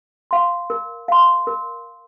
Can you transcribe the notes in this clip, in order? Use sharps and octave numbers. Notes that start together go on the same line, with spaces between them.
F5 C6
A#4
F5 C6
A#4